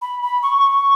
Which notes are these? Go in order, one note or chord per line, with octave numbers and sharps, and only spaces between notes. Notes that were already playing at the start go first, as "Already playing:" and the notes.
B5
B5
C#6
C#6